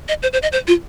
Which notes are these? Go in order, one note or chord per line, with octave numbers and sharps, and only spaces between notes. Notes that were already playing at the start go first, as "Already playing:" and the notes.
D#5
C5
C5
D#5
C5
F4